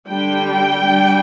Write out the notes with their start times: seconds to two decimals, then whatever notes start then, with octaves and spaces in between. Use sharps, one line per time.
0.08 D3 G3 D4 G5
0.84 G3 D4